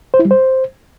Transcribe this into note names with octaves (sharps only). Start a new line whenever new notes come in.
C5
E4
G3
C5